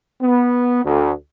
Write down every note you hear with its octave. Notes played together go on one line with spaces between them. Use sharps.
B3
D2